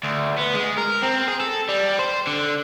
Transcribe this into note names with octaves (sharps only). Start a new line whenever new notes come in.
D2
B3
G#3
A#4
C4
G#4
A4
G3
C5
D3